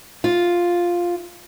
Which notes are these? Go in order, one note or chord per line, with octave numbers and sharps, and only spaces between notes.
F4